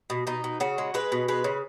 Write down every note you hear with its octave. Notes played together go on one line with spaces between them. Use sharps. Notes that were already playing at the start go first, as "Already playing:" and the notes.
B2
B2 D#4
B2
C#3 F#4
G#3
G#3 B4
B2
G#3 B4
C#3